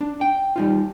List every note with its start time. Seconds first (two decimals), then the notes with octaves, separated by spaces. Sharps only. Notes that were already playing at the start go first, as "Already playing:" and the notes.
0.01 D4
0.21 G5
0.56 G3 D#4 F4